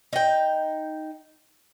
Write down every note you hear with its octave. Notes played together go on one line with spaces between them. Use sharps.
D#4 G5